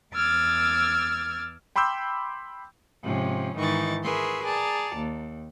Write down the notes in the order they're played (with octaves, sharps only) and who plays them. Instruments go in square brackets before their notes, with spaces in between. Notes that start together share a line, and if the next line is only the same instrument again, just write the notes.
[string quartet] E2 D6 E6 F6 G#6 A6
[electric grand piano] G5 B5 C6 D6 E6 G6
[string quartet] G#2 C3 F3 C#4
G#2 D#3 E3 D#4 C#6 A6
G#4 A#4 B4 E5 C6 C#6
G#4 D5 A5 A#5
D#2